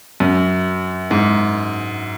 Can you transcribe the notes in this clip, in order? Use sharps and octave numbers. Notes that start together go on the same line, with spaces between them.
F#2
G#2